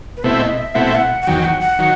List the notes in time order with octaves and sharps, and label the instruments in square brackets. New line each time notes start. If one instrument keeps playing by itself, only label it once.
[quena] B4
[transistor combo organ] B2 A3 C4 E4 [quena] C5
[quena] D#5
E5
[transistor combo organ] B2 A3 C4 E4 [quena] F#5
[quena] E5
F#5
F#5
[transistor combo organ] E2 D#3 F#3 [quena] G5
[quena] F#5
F#5
[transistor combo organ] D#3 F#3